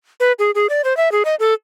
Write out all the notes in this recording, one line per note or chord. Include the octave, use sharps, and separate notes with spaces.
B4
G#4
G#4
D5
C5
E5
G#4
D#5
A4